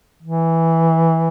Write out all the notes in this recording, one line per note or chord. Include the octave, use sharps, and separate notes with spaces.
E3